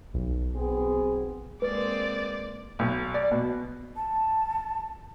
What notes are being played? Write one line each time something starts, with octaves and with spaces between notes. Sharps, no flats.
B1
B3 C4 G#4
G#3 A#3 C4 B4 D5
B1
D5
B2
A5